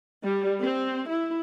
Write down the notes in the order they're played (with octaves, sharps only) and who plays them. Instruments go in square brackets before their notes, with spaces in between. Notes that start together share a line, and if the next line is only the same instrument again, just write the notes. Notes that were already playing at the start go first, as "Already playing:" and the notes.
[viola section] G3
C4
E4